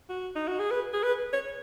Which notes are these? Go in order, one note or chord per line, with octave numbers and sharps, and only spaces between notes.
F#4
D#4
F#4
G#4
B4
G#4
B4
C#5